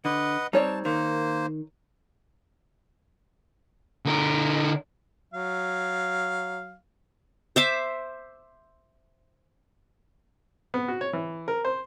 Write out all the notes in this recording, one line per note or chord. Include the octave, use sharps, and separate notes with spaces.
D3 B4 D#5 F#5
G3 C4 D#4 C#5 D5 A5
D#3 A#3 C5
D3 A#4
F#3 F5
C5 E5 D6
B3
F#4
C#5
E3
A#4
C5